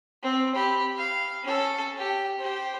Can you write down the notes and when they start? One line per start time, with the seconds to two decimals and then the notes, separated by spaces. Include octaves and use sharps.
0.23 C4
0.55 G4 B5
0.97 F5
1.43 C#4 A4
1.98 G4
2.39 G4 C5